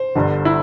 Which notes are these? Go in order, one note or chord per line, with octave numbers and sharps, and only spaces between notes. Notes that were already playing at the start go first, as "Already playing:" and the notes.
Already playing: C5
G1 G2 D3
E4